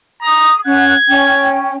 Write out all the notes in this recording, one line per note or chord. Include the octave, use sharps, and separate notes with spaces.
A#5 D#6
C#4 F#5 F#6 G#6
C#4 G5